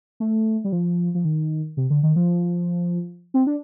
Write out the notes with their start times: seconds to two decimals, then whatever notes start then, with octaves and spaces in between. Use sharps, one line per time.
0.20 A3
0.64 G3
0.72 F3
1.15 F3
1.25 D#3
1.77 C3
1.90 D3
2.03 D#3
2.16 F3
3.34 C4
3.47 D4